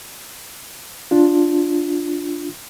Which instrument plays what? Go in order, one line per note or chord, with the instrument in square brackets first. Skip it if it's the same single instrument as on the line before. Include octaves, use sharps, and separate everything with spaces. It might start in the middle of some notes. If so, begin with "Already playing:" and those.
[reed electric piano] D4 F4